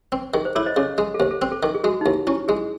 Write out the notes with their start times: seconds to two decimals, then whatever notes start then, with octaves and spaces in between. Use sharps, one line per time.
0.12 C4
0.34 D#3 G#4
0.45 C5
0.55 E4 A4 C#5
0.66 C5 D#5
0.76 C#3 A4 C#5
0.98 G#3
1.15 A4
1.19 D#2 C5
1.31 A4
1.41 C4 C5
1.52 A4
1.63 D#3 A4
1.74 G#4
1.84 G#3 F#4
2.01 D#4
2.06 D#2 E4
2.27 C#4 E4
2.48 G#3 G#4